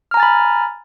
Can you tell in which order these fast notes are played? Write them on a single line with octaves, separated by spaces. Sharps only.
F6 A#5 G#5 A6 B5